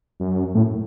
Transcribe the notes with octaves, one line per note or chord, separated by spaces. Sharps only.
F#2
A2